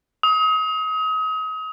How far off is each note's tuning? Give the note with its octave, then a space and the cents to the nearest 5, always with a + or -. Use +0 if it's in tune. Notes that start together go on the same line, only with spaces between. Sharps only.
D#6 +35